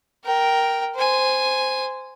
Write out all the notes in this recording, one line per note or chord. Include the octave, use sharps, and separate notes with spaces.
A#4 G5
C5 G#5